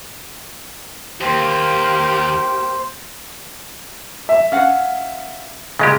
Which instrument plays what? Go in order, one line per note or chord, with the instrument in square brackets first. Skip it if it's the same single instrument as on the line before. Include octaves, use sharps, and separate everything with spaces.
[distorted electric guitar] D#2 [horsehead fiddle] A#3 G4 [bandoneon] C5
[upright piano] E5
[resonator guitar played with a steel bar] C#4 F5 F#5
[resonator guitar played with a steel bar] A#2 D#5 [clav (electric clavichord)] C#3 G#3 G4